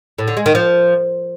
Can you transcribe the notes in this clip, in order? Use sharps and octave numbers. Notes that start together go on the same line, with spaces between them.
A2
D3
G#3
D#3
F3